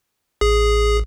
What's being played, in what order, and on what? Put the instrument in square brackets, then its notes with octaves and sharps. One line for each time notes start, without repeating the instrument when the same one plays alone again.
[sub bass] A1 [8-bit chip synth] G#4